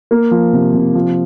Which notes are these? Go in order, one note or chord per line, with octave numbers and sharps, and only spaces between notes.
A#3
F3
C3
C3
F3